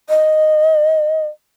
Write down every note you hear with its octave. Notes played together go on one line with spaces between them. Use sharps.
D#5